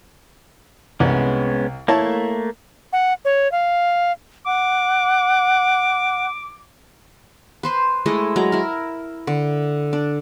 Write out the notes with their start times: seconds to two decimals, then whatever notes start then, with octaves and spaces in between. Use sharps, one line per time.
1.00 C2 G#3 B3 C#4
1.88 A3 A#3 E4 C#5 A5
2.93 F#5
3.25 C#5
3.52 F5
4.46 F#5 D6
7.63 B4 C5 C6
8.06 G#3 A3 E4 D#5
8.36 F#3 G#3 A#5
8.52 E4 A#4
9.27 D3
9.93 D4